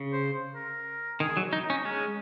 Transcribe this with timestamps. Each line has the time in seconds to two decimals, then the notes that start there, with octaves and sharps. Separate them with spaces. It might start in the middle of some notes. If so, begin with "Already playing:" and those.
Already playing: C#3
0.13 C5
0.55 A#4
1.20 D#3 G#4
1.37 F#3
1.53 D#4
1.64 D#4
1.70 C#4
1.85 G#3 C#4